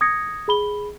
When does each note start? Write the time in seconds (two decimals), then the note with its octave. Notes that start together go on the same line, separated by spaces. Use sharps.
0.01 D#6 G#6 A#6 C#7
0.48 G#4 B5 G7